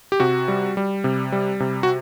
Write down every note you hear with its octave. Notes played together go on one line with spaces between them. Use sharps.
G4
C3 F#4
G3
G3
C3
G3
C3
F#4